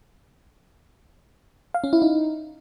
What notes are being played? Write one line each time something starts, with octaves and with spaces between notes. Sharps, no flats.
F5
C#4
E4
D#4